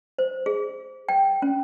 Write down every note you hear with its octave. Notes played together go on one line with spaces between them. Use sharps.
C5
G#4
G5
C#4